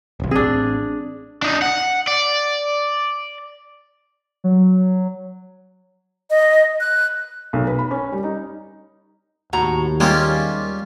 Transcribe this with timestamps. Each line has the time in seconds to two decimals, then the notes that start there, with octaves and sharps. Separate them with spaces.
0.20 D#1 B1
0.31 A1 C4 D4 G#4
1.42 D4 D#4
1.62 F#5
2.07 D5
4.44 F#3
6.30 D#5
6.80 F#6
7.53 B1
7.67 B4
7.79 B5
7.91 C#4
8.12 G3
8.24 D#4
9.53 D#2 A2 F#4 A#5
10.00 G3 G#3 A#3 C#4 F4 G4